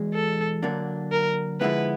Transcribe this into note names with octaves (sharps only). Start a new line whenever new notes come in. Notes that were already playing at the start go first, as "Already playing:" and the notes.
Already playing: E2 B2 G#3
A4
D3 F#3 A#3 D4
A#4
D3 F3 G#3 B3 E4 B4